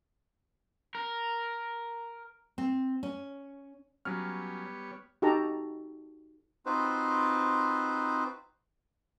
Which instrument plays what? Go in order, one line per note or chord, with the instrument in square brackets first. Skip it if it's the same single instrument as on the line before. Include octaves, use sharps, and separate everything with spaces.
[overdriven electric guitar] A#4
[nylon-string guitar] C4
C#4
[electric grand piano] F#3 C#4 F6 [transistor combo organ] G3 B3 C#5
[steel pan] D#4 F#4 G4 A4 A5 A#5
[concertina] C4 D#4 F4 F#4 B4 C5